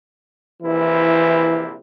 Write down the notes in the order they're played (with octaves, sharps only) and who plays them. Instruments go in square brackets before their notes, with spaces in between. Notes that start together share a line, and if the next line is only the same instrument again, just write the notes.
[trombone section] A#1 C3 E4 [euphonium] E3